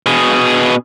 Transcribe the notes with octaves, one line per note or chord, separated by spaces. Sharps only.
B2 G#4